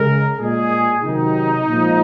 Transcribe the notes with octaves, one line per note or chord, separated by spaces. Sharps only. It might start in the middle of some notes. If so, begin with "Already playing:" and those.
Already playing: C#3 G#3 A#4
A#2 G#3 G#4
C3 D#3 F#3 D#4
A#2 F3 G#3